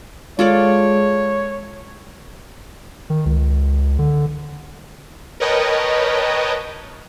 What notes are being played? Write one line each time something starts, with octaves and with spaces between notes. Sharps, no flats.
G#3 F4 A4 C#5 D5
D#3
C#2
D3
A#4 B4 C#5 D#5 G5 A5